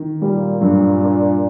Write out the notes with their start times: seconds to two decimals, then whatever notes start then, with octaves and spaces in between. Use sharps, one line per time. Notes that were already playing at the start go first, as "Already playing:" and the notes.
Already playing: D#3
0.21 A#2 G3
0.62 G2
1.01 D4